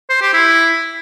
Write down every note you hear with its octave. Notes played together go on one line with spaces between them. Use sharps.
C5
G4
E4